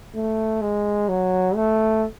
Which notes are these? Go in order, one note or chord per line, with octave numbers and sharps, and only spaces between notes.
A3
G#3
F#3
A3